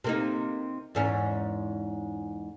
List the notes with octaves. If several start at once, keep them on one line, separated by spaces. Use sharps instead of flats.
C3 A#3 D#4
E2 G#2 C#4